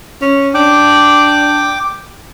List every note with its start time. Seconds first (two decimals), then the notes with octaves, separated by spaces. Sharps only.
0.22 C#4
0.55 D4 G5 D6